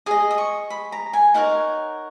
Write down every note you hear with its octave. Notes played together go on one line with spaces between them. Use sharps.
G#4 D#5 D#6
D#6
C#6
B5
A#5
G#5
D#4 A#4 C#5 F#5